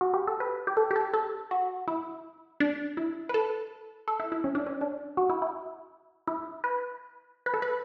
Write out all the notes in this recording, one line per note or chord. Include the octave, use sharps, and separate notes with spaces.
F#4
G4
A4
B4
G4
A4
G4
A4
A4
F#4
E4
D4
E4
B4
A4
A4
E4
E4
C#4
D4
C#4
D4
F#4
E4
E4
E4
B4
B4
A4
B4